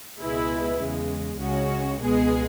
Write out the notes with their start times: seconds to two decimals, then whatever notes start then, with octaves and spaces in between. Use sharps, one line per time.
0.18 C#2 B2 G#3 E4 B4
0.79 E2 C#3 G#3
1.39 C#2 C#3 G#3 C#4 F#4
1.99 C#2 B2 G#3 B3 G#4